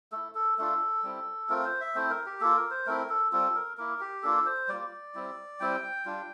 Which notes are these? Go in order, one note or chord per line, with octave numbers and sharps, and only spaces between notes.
A3 E4 A4
A4
A3 D4 F4 A4
G3 C4 E4
A3 C4 F4 A#4
C5
E5
A3 C4 E4 C5
A#4
G4
A#3 F4 A4
A#4
C5
A3 C4 E4 A#4
A4
G3 C4 F4 A4
A#4
A#3 E4 A#4
G4
A#3 D4 F4 A4
C5
G3 A#3 F4 D5
G3 C4 E4
G3 C4 E4 G5
G3 D4 F4